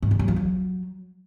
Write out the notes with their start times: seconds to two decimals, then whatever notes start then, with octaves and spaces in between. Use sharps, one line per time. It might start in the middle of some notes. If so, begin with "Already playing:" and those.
0.02 G#2
0.11 D3
0.19 F#3
0.28 F3
0.36 F#3